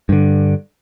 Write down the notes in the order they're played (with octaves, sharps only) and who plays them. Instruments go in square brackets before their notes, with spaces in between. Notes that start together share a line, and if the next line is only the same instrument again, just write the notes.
[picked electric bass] G2 D3